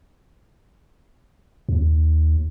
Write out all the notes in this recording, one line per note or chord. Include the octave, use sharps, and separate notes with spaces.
D#2